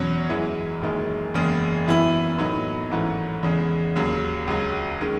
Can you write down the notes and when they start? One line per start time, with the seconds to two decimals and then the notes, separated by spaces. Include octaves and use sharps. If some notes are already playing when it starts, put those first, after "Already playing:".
Already playing: E2 B2 F#3 C#4
0.29 F#2 E3 G#3
0.82 F#1 F#2 D#3 G#3
1.34 F#1 E2 C#3 G#3
1.86 F#2 E3 B3 E4
2.38 A2 F#3 B3 D#4
2.91 G#1 G#2 E3 A3 C#4
3.43 E2 C#3 G#3
3.95 D#2 C#3 F#3
4.47 C#2 C#3 F#3
5.01 D#3 G#3 C#4